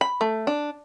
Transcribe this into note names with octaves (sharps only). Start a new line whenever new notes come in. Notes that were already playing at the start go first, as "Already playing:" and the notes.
B5
A3
D4